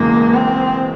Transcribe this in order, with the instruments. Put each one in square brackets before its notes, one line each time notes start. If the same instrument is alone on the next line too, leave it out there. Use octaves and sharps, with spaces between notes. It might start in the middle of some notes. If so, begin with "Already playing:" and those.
Already playing: [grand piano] E1 E2 C#3 E3 G#3 [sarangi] A#3
[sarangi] C4